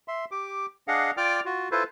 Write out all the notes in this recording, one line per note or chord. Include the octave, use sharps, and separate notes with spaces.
E5 C6
G4 D6
D4 G#4 D#5 F5 F#5
F4 D5 G5 D6 F6
F4 F#4
E4 F4 A4 B4 C5